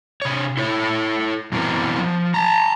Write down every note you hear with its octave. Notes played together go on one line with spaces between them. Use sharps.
C3 C#5
E4 A4 C#5
F#2 B2 E3 C4 A#4
F3
A5 A#5